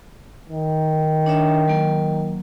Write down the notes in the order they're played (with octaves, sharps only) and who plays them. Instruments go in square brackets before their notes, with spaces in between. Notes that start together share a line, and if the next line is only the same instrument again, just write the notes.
[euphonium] D#3
[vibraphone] D4 C#5 E5
F#3 A#3